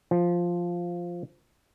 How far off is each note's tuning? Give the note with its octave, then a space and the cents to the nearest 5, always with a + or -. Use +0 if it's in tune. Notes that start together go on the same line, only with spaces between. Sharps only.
F3 +0